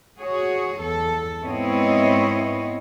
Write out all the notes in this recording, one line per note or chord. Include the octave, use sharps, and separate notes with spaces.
F#4 G#4 C#5
E2 A4
G#2 B3 C4 E4 C#5 D#5